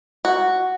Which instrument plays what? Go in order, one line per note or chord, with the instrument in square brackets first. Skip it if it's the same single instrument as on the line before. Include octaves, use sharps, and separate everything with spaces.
[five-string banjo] F#4